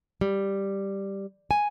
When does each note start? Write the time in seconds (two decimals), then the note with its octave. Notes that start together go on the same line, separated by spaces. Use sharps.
0.21 G3
1.51 G#5